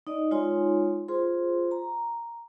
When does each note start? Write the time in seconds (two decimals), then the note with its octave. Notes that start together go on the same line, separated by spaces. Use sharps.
0.07 D#4 D5 D#5
0.31 G#3 D#4 F4 C#5 G#5 C6
1.08 F4 G#4 C5 C6
1.71 A#5